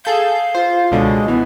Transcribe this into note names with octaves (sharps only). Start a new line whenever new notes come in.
G#4 A4 F5 G6
F4 C5
C#2 B2 D3 G#3
E3 B3